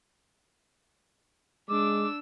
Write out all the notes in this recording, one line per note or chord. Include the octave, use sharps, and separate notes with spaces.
G#3 D4 D6 E6